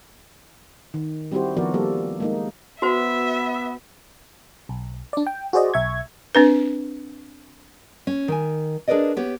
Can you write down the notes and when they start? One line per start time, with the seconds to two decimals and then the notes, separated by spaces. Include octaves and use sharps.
0.94 D#3
1.32 G3 C4 E4 F#4 G4 C5
1.57 D#3 F3 B3 F#4 A#4 D5
1.74 G3 A#3 A4
2.20 G#3 A#3 D#4
2.82 B3 F#4 C5 E5
4.69 B1
5.13 D4 D5
5.27 G5
5.53 F#4 G#4 C5 D5 D#5
5.74 B1 E5 C#6 G#6
6.35 C4 D4 B4
8.07 C#4
8.28 D#3 G#5
8.88 D4 G#4 A#4 B4 D5 D#5
9.17 B3 G4 C#5